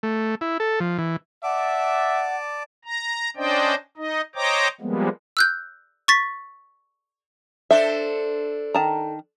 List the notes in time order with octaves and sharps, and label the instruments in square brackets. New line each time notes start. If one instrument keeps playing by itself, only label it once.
[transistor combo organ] A3
E4
A4
F3
E3
[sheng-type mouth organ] D5 A5 D6 [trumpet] E5 [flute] F#5
[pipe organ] A#5
C#4 D4 C5 D5 D#5 G5
D#4 D#5
C5 C#5 D#5 G5 A#5 D6
F3 G3 G#3 A#3 B3
[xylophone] E6 F#6 G6
C#6 A6 B6
[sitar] D4 A4 C5 [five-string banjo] E5
[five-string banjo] D#3 A5 A#5